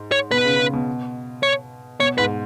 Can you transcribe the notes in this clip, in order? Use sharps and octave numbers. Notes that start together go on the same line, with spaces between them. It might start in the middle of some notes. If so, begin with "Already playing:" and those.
Already playing: G#2
C#5
B2 B4
C#3
C#3
B2
C#5
B2 C#5
G#2 B4